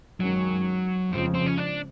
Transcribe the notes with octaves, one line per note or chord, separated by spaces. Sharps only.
F#2 D#3 F#3 G#3 C#4
F2 C#3 F3 G#3 C4
C4
C#4
D4